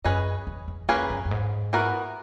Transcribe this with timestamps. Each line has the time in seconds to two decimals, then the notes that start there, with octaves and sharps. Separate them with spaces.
0.04 F#2 C#4 G#4 B4 D#5
0.47 E2
0.68 E2
0.89 E2 A#3 C#4 G#4 B4
1.10 F#2
1.25 F#2
1.31 G#2
1.73 E3 B3 F#4 A#4